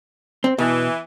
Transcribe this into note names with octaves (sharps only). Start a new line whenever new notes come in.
C4
B2 E3